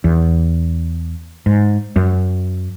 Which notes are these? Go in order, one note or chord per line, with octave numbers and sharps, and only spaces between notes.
E2
G#2
F#2